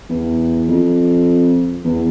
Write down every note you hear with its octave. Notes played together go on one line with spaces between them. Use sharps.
E2
F2
E2